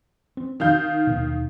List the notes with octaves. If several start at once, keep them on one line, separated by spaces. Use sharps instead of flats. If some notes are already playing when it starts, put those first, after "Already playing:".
C4
D#3 F5 G6
D#2 B2